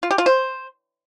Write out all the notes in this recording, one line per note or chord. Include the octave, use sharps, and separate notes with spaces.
F4
G4
F4
C5